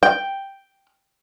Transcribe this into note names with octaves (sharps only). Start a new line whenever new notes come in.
G5